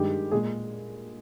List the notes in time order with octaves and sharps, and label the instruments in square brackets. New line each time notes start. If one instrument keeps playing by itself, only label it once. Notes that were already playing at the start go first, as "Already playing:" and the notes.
Already playing: [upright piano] G2 D#3 G#3 G4
A#2 G#3 G#4